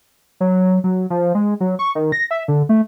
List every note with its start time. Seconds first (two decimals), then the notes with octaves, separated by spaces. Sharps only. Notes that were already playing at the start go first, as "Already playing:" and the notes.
0.40 F#3
0.84 F#3
1.10 F3
1.35 G#3
1.60 F#3
1.79 C#6
1.95 D#3
2.12 A#6
2.31 E5
2.48 D3
2.69 A3